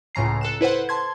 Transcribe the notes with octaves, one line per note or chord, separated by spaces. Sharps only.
C#2 A2 C#3 A#5 C7
A4 F#6 E7
E4 B4 C5 F#5
A5 C6 G#6